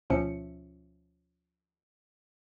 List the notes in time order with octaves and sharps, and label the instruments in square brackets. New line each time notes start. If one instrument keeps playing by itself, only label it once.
[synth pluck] D2 B2 F3 C#4 E5 C#7